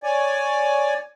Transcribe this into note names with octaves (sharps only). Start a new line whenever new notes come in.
C#5 D5 G#5